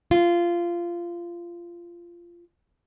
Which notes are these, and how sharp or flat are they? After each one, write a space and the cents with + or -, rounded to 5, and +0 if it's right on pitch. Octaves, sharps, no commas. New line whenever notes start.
F4 -20